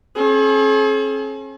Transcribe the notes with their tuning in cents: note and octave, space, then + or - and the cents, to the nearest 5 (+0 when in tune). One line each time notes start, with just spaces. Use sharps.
C#4 -45 G#4 +45